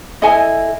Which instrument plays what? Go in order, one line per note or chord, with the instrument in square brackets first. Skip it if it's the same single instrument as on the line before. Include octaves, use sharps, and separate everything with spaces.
[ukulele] E4 A4 D#5 G#5